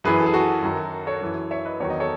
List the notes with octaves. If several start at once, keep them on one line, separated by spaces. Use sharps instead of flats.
F#2 E3 G#4 B4
A4
G#4
F#4 A4
F#2 D#3 F#3
A4 C#5
F#2 E3
C#5 E5
B4 D#5
E2 D#3 F#3 C#5
D#5
A4 C#5